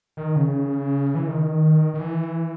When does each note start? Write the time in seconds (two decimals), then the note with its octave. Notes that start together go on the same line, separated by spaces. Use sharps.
0.17 D#3
0.36 C#3
1.15 E3
1.27 D#3
1.94 D#3
1.99 E3